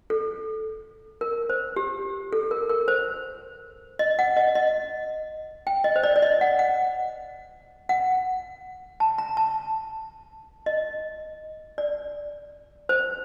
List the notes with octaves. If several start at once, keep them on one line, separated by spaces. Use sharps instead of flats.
A4
A#4
C5
G4
A4
A#4
A#4
C5
D#5
F#5
D#5
D#5
G5
D#5
C5
D5
D5
D#5
F#5
F#5
F#5
A5
A#5
A5
D#5
D5
C5